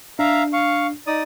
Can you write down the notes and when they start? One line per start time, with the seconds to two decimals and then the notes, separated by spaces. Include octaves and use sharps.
0.19 D4 E5 F5 A#5
0.53 F5 C#6
1.07 D#4 D5 D#6